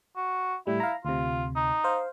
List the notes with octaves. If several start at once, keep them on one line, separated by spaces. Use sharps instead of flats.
F#4
A2 G3 E4
F5 A#5
D2 C3 F4
D#4
C5 F5